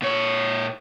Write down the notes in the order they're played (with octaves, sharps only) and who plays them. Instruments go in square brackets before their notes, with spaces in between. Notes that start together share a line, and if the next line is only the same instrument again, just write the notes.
[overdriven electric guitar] A#2 C#5